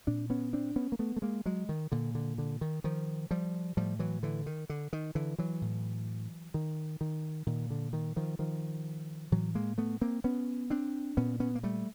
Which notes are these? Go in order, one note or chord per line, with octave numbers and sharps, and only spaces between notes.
A#2 C4 D4
B3 C#4
C4 D4
B3 C#4
A#3
A3 B3
A3
G#3 A#3
F#3 G#3
D#3
A#2 D3
D3
D3
D#3
D#3 F3
F3 G3
A2 F3 G3
E3 F#3
D3 E3
D#3
D3
D#3
D3 E3
E3 F#3
A2
D#3
D#3
A#2 D#3
D3
D#3
D#3 F3
D#3 F3
A2 E3 F#3
G#3 A#3
A3 B3
A#3 C4
B3 C#4
C4 D4
A#2 B3 C#4
B3 C#4
A#3
G3 A3